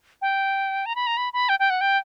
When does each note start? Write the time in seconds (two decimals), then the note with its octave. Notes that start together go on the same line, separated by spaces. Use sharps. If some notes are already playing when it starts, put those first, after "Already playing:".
0.22 G5
0.86 A#5
0.96 B5
1.07 A#5
1.17 B5
1.33 B5
1.49 G5
1.59 G5
1.70 F#5
1.81 G5